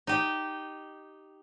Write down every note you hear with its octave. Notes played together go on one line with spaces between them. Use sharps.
D#4 G4